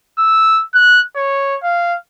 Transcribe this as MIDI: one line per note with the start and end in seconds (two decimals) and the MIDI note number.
0.19 0.63 88
0.75 1.01 90
1.16 1.57 73
1.63 1.95 77